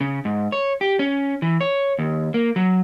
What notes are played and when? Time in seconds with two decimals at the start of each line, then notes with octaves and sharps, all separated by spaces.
0.01 C#3
0.25 G#2
0.52 C#5
0.81 G4
0.99 C#4
1.42 E3
1.61 C#5
1.99 D#2
2.34 A#3
2.56 F#3